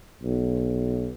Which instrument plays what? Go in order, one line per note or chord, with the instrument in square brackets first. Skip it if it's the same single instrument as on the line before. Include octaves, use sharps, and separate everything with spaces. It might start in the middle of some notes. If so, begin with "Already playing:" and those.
[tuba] B1